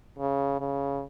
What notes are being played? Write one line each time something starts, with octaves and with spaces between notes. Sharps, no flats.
C#3
C#3